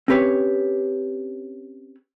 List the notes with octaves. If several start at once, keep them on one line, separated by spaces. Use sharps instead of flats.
C4 C#4 G4 B4 C#5